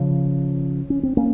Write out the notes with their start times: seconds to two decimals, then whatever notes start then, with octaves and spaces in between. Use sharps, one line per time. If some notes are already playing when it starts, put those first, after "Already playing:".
Already playing: C#3 F3
0.90 C#4
1.03 C4
1.17 A#3 C#4